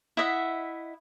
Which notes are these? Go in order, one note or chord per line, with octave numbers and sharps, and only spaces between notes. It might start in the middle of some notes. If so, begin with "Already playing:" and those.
E4 D#5 E5 F#5